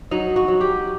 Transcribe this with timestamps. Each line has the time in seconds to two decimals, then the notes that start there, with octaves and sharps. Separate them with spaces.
0.11 F#3 D#4
0.36 F#4
0.48 F#3
0.61 G4